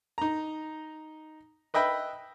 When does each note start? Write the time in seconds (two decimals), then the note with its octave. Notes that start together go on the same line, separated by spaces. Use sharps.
0.18 D#4 A#5
1.74 B4 D#5 E5 G5 B5